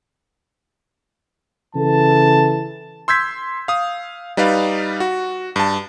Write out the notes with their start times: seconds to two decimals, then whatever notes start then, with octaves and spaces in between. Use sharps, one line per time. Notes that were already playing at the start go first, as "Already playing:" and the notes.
1.75 C#3 E3 A4 A5
3.08 C6 E6 G6 G#6 B6
3.68 F5 D#6
4.37 G3 D#4 B4 D5 F5
5.00 F#4
5.56 G2 A5